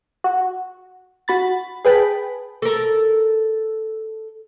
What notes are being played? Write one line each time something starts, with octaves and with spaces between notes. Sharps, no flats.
F#4
F#4 B5 A6
G#4 B4 G5 A5 B5
A4 A#4